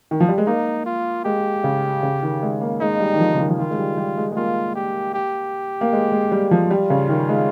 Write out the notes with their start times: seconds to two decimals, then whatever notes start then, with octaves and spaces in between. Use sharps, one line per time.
0.11 D#3
0.20 F3
0.29 G3
0.38 G#3
0.47 A#3 D#4
0.86 F4
1.25 G#3 G4
1.64 C#3
2.03 C#3
2.23 D#3
2.42 G#3
2.62 A#3
2.81 G#3 D#4
3.00 G3
3.13 D#3
3.20 F3
3.34 C#3
3.39 D#3
3.50 F3
3.59 D#3 F4
3.71 G#3
3.78 G3
3.98 G3
4.17 G#3
4.32 G#3
4.36 A#3 F4
4.76 G4
5.14 G4
5.81 A#3
5.93 G#3
6.12 G#3
6.32 G3
6.51 F3
6.71 G3 F4
6.90 C#3
7.09 D#3
7.29 G#3